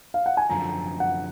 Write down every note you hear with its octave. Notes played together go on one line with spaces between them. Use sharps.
F5
F#5
G#5
F#2 D3 F3 A#5
F#5